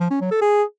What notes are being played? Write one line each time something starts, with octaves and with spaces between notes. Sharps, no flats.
F3
C#4
F#3
A4
G#4